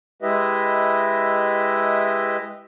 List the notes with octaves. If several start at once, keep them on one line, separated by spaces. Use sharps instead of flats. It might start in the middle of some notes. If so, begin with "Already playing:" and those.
G#3 E4 G4 B4 D#5 E5